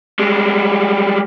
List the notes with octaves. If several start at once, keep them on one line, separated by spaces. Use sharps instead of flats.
G3 G#3